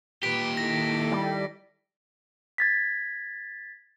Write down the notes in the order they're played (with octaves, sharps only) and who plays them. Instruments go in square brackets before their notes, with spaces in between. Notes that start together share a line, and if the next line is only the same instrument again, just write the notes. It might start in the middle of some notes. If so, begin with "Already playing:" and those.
[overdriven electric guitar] A#2 G4 [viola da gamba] B4 [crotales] B6 D7
[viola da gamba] D#3 E4 A4 [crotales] A#6
[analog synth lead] G3
[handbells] G#6 A6 B6